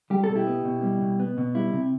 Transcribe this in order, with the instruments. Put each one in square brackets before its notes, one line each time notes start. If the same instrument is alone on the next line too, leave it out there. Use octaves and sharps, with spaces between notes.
[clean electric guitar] G3 G4
A4
B2
E4 G4
B3
B2
G3
B2
B3
B2
G3 E4
C3